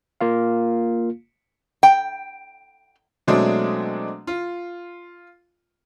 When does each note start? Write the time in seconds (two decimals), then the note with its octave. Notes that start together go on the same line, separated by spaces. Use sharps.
0.21 A#3 F4 F5
1.83 G5
3.28 B2 F#3 G#3 A3 C4 D4
4.27 F4